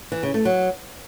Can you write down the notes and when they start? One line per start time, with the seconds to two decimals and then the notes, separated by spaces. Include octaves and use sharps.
0.12 E3
0.23 C#3
0.34 A3
0.45 F#3